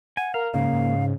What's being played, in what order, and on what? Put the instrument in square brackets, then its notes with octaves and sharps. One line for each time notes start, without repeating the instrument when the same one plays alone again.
[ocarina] F#5 [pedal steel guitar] G#5
[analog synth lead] A#4 [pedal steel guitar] F5
[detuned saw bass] G#2 [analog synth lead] C#3 [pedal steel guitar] A#3 [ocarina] F5
[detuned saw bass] G#2